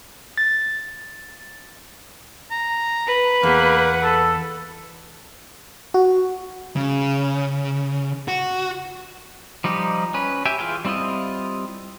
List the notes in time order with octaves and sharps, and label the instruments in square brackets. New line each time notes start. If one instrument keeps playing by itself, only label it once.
[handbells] A6
[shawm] A#5
[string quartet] B4
[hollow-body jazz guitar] E2 [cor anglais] A#3 [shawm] F#5
[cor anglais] A4
[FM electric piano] F#4
[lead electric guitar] C#3
F#4
[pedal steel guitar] F3 G3 D#4 G4
C#4 B4
G4 E5 G5 G#5
E3 F4 G#4 G5
G3 C4 E4 F4 D#5